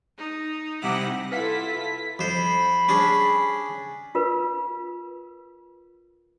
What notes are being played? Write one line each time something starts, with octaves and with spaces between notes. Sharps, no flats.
D#4
C3 G3 D#4 E4 F#5
E4 F4 A4 B4 F5 F#5 B6
F2 C5 B5
C#4 D4 G#4
F4 A#4 B4